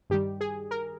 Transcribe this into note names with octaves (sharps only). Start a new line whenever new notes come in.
G2 D#3 G3 G4
G#4
A#4